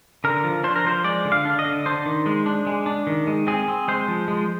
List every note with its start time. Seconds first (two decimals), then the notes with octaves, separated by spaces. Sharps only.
0.24 D3 A#4
0.44 F3
0.64 D4 C5
0.76 A#4
0.84 F3 C5
1.04 G#3 D5
1.25 D3
1.32 F5
1.45 D4
1.59 D#5
1.65 D3
1.86 D4 C5
2.06 D#3
2.26 G#3
2.46 D4
2.67 G#3
2.86 D4
3.07 D#3
3.27 G#3
3.47 C4 G#4
3.68 C4
3.88 G#3 C5
4.08 F3
4.28 G#3